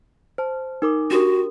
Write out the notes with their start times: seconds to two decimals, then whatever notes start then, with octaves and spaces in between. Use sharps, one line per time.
0.38 C5 A5
0.82 D#4 A#4 D6
1.11 D4 F#4 G4 A#4